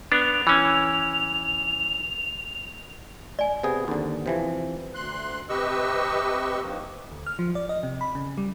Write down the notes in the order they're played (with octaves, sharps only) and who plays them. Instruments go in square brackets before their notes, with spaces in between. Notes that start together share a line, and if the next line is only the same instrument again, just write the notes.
[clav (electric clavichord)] B3 D4 [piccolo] F7
[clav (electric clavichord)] E3 C#4
[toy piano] D5 G#5
[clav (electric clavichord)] C3 B3 G#4
D#2 D3
C3 E3 F3
[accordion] D2 C6 F#6
C3 G4 B4 D#5 C#6 E6
G2 D#3 F3 A#3
[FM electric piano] D2
F6
F3
D5
D#5
C3
B5
C#3
G3